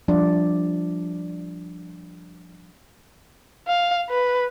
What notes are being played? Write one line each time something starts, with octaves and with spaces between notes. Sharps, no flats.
F3 G3 D4 D5 E5
F5
B4